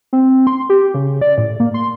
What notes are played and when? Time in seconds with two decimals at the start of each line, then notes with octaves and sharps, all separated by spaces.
0.13 C4
0.47 C6
0.69 G4
0.94 C#3
1.21 D5
1.38 A2
1.60 A#3
1.74 C6